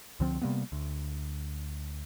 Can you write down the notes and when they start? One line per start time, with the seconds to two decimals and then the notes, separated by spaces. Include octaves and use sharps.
0.20 C#2 D3 F3 C4
0.42 C3 G3 A#3 B3
0.72 D2